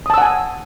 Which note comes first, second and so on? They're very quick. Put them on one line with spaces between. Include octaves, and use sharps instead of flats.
D#6 A5 E6 F#5 G#5